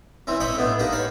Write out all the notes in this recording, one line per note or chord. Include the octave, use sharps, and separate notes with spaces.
E3 C4 C#4
C#5 D#5 E5 G5 B5 D6
A2 B3 D4
A#3 D#4 G4 B4
C#5 F5 A5 B5